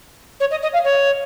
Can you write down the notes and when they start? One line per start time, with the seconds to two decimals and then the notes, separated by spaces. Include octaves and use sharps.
0.40 C#5
0.50 D#5
0.62 D#5
0.73 F5
0.84 C#5